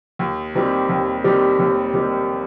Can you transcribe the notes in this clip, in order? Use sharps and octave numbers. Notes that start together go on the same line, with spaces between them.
D#2
D#3 G3 C4 G4
D#2
D#3 G3 C4 G4
D#2
D#3 G3 C4 G4